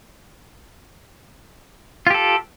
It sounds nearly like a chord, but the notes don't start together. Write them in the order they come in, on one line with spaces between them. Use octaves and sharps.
F4 G4 A4